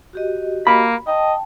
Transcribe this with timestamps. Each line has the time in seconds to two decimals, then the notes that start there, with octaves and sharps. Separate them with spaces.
0.13 F#4 G4 D#5
0.67 A#3 B5
1.07 D#5 G5 A5